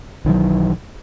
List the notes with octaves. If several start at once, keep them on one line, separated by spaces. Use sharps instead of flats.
B1 D#3 E3 F#3